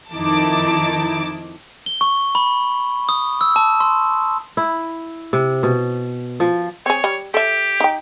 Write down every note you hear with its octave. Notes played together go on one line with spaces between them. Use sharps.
F2 D#3 D#4 E4 A5 D6
G7
C#6
B5
D#6
E6
A5
C6
E4
C3
B2
F3
C4 G#4 C#5
G3
G4 A4 E5
D#4 G5